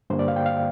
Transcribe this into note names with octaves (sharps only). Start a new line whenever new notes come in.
G2 D3 G3 A#3 C5
D5
F5
G5
F5